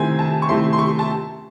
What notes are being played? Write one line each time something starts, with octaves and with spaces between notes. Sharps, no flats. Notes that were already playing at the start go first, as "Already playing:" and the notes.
Already playing: C3 D#3 A3 C4 E4 G#5
A5
C#6
C3 D#3 A3 C4 E4 C6
C6
C#6
A5